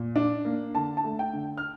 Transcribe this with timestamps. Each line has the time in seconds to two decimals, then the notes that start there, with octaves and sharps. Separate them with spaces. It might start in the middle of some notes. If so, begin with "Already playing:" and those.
Already playing: A#2
0.16 D4
0.45 A#3
0.75 D3 A5
0.97 A5
1.04 A3
1.19 G5
1.33 D3
1.58 F6